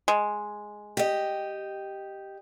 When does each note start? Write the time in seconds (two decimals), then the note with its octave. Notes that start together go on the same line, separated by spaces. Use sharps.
0.08 G#3
0.97 G4 D#5